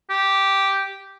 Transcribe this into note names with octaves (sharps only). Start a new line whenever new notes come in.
G4